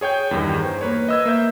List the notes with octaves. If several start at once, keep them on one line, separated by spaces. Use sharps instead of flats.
G#4 C#5 G5 G6
E2 G2 D#3
C5
A#3 B4 C#5
D#5 E6 G#6
A#3 E5 G6